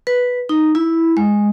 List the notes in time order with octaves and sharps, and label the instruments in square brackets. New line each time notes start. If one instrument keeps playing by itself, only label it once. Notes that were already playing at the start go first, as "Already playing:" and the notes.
[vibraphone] B4
D#4
E4
G#3